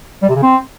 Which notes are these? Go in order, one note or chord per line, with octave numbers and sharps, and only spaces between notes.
G3
C3
C#3
C4